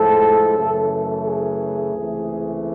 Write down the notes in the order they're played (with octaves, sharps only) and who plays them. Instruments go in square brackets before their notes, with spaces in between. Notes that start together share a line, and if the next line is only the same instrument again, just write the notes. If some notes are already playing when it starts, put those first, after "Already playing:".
Already playing: [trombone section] A2 F3 G#3 A4
F#2 C#3 E3 A3
G#4
C#2 C3 E3 A3